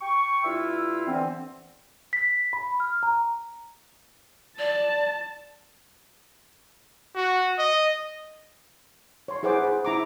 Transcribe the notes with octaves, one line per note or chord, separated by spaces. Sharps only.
G5 C#6
G2 E4 F4 E5 E6
D3 E3 B3 C4
B6
B5
F6
A#5
D5 A5
F#4
D#5
C#5 C6
E4 G#4 B4 C5 F#5 D6
E4 G#4 C5
E4 A#5 D6